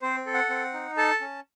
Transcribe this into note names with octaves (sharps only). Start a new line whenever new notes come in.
C4 C5
A4
F#5
C4
D#4
A4 A5
C#4